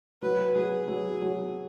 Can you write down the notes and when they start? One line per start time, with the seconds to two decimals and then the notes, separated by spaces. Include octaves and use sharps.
0.22 F#3 B4
0.56 F#3 G#4
0.88 F#3
1.22 F#3